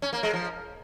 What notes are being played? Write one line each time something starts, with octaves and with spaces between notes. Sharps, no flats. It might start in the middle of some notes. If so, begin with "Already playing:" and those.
C#4
A#3
G#3
F3